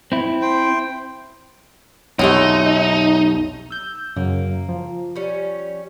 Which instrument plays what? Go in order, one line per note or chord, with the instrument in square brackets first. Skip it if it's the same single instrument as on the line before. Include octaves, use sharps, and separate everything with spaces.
[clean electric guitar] C4 E4
[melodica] C5 G5
[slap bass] B1 F2 [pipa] D3 G#3 A3 [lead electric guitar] D#4 [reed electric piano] G4 C#5
[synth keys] E6 G6
[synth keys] F#2 C#3 [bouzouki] A#3
[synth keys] F3
[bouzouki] G3 C#4